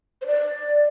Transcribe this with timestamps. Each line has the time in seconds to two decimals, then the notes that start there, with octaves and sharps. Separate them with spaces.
0.22 C5
0.27 D5